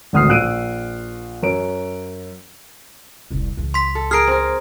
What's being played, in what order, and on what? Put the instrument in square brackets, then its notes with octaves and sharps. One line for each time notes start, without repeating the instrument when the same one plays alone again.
[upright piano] G#1 D2 D#6 F6 C7
A#1 E6 F#6 D7 D#7
F#2 C#5 D7
[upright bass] E1 C2
C#2 E3
[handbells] C6 B6
[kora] A4
[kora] G#4 A#4 [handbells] F6 C7 D7
[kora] C4 A#4